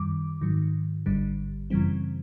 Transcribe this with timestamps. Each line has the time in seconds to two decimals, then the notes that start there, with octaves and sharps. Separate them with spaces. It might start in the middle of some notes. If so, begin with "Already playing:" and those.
Already playing: F#2 D#3 G3 D6
0.41 G#2 D#3 F#3
1.06 G#1 G2 D3 G3
1.70 F#2 C#3 E3 G3 C4